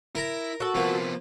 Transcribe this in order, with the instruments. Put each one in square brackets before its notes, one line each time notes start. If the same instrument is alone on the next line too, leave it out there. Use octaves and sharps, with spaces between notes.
[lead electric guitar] E4 [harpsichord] A#4 A#5
[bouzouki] F#4 A4
[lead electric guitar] C3 B3 [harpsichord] F3 A#3